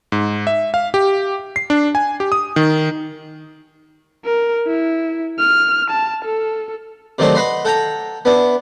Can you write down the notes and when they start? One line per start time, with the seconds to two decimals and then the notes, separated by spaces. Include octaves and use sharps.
0.12 G#2
0.47 E5
0.74 F5
0.94 G4
1.56 C7
1.70 D4
1.95 G#5
2.20 G4
2.32 D#6
2.56 D#3
4.25 A#4
4.67 E4
5.39 F6
5.90 A5
6.25 A4
7.18 C3 D#3 F#3 A3 D4 C5
7.35 B4 D#5 F#5 B5 C6
7.65 A4 F#5 G5 A5 A#5
8.25 B3 D4 E4